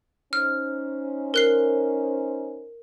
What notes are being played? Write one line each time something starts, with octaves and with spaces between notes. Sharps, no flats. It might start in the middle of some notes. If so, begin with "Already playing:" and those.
C#4 D#4 C5 F6
A#4 F#6 C7